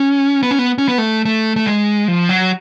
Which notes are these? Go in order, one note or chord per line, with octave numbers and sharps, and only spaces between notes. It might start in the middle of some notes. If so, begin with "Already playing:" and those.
Already playing: C#4
B3
C#4
B3
C#4
B3
A3
A3
A3
G#3
F3
F#3